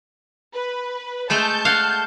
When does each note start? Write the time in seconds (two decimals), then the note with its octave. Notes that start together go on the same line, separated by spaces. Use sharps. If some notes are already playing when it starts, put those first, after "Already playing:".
0.54 B4
1.30 G#3 A3 A4 A5 G6
1.65 F5 F#5